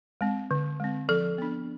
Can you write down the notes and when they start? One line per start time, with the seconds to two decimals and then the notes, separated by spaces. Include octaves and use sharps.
0.21 G#3 C4
0.51 D3
0.80 G#3 C4
1.09 F3 A4
1.38 B3 D4